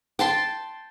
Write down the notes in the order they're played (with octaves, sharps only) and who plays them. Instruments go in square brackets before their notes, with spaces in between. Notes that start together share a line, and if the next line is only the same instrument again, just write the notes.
[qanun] G5 A5 C6